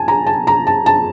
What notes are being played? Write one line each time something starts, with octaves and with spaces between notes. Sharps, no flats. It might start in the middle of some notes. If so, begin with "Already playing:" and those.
Already playing: G#5 A5
A#5
A5
A#5
A5
A5